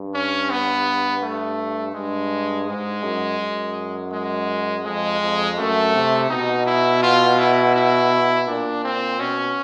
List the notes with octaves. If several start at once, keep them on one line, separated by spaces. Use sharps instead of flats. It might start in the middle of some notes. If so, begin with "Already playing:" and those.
Already playing: G2
C#4
B3
A3
G2 G#3
G#2 G#3
F#2
F#2
G#3
F2 G#3
F2
F#2 A3
C3
B2 D#4
E4
F4
E4
E4
A#2 D4
C4
B2 C#4